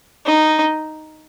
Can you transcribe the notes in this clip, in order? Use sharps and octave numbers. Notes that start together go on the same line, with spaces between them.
D#4